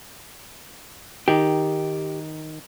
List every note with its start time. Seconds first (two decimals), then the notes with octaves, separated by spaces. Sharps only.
1.28 D#3 D#4 G4